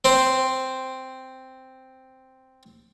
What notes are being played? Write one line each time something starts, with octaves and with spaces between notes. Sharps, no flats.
C4 C5